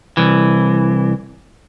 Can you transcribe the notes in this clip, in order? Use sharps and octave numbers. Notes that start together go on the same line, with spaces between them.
C2 E3